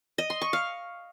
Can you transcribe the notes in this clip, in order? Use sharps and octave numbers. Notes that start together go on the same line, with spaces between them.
D#5
C6
C#6
F5